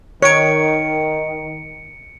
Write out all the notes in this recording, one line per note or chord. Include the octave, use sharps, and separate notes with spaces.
D#3 C#5 C#7 D7